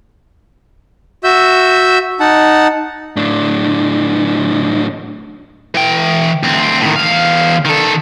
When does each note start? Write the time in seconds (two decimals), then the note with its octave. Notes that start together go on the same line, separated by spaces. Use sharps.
1.24 F#4 E5 E6 G6
2.20 D#4 F#5 A5
3.16 A2 D4
5.75 E3 G5
6.43 D2 C4
6.81 A2 D#3
6.96 E2 F5
7.65 D#3 A4